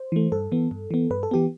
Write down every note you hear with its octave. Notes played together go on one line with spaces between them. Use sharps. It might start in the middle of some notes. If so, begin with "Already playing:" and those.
Already playing: C5
E3 A3
G2 A4
E3 B3
G2
E3 B3
G2 B4
A4
E3 B3 G4